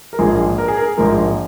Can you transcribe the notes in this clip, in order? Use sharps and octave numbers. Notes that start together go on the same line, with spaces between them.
A#4
A#1 G#2 F3 A#3 G#4
A#4
G#4
A#4
A#1 G#2 F3 A#3 A#4